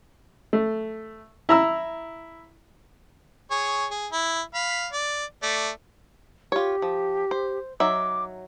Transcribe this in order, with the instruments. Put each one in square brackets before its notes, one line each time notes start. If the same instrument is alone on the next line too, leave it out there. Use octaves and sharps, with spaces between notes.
[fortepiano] A3
E4 A#5 E6
[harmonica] G#4 C#5
G#4
E4
F5 B5
D5
A3 D5
[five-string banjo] F4 C#5 [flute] G4
[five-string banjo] F3
C5
[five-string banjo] F#3 D#4 E5 [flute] D6